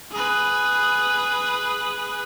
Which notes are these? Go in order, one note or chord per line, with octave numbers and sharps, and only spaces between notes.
G#4 B4